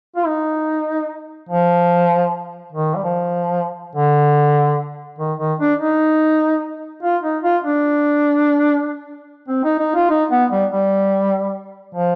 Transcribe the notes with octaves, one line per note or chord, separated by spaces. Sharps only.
F4
D#4
F3
D#3
G3
F3
D3
D#3
D#3
D4
D#4
F4
D#4
F4
D4
C4
D#4
D#4
F4
D#4
B3
G3
G3
F3